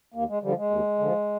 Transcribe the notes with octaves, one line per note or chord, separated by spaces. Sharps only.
D#2 A#3
G#3
D3 F3 G3
G#3
D#2
D3 F3